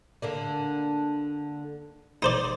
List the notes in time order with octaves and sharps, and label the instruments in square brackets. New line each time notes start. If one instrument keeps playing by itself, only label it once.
[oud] D3 A#3 D4
[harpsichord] D#4 C5 D5